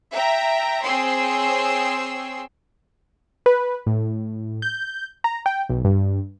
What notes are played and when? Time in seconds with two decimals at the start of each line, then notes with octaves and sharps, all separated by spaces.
0.13 E5 G5 A#5
0.83 C4 G#4 C#5 G5 C6 E6
3.46 B4
3.86 A2
4.62 G6
5.24 A#5
5.46 G5
5.69 B1
5.85 G2